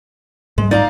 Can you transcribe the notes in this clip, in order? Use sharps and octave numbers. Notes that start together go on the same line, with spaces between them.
G#2 G3 G#3
D#4 D5 F5 A#5